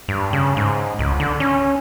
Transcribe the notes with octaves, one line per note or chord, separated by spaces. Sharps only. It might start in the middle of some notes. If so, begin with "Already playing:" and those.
G2
C#3
G#2
C#2
D3
C#4